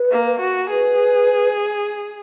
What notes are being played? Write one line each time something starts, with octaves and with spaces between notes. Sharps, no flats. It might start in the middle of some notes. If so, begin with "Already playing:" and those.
Already playing: B4
A#3
F#4
G#4 B4